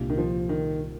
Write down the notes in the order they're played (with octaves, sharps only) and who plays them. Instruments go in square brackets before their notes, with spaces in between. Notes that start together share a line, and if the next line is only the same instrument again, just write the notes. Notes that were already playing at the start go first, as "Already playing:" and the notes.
Already playing: [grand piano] C2 A#2 G3 D4 F4
[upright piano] D#3
F3
D#3